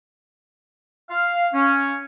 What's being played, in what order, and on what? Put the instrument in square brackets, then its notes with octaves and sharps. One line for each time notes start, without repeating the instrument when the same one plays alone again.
[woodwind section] F5
C#4